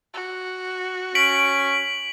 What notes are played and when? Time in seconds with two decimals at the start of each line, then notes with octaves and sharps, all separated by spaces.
0.14 F#4
1.15 C#4 B6 D7 F#7